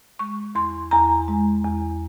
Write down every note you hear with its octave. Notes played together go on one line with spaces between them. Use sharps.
G#3 C#6
E2 C6
E2 A#5
G#3
E2